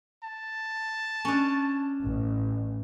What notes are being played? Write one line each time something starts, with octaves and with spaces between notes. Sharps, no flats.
A5
C#4 D4
A1